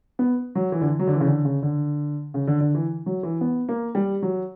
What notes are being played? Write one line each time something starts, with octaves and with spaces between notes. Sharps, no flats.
B3
F#3
E3
D3
E3
F#3
D3
E3
C#3
D3
C#3
D3
C#3
D3
D3
E3
F#3
E3
B3
A#3
G3
F#3